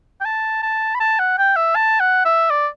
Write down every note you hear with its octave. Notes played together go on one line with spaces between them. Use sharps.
G5
A5
A5
B5
A5
F#5
G5
E5
A5
F#5
E5
D5